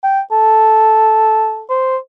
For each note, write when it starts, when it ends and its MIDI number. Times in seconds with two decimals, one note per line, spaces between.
0.03 0.21 79
0.32 1.62 69
1.70 1.97 72